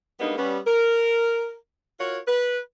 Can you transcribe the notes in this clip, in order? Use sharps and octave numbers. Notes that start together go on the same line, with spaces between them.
G3 G#3 A#3 B3 D4 D#4
G3 B3 C#4
A#4
F4 F#4 A#4 C#5
B4